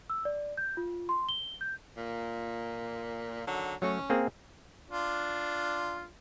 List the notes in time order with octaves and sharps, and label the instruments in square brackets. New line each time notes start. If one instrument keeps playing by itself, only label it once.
[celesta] E6
D5
G6
F4
C6
G7
G6
[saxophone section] A#2
D3 D#3 F#3
[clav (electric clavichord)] F#3 A3 F#4 [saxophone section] C#4
[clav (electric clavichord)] A#3 C4 G#4
[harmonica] D4 F4